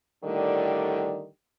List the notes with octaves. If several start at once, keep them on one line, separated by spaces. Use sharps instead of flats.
A2 D3 D#3 G3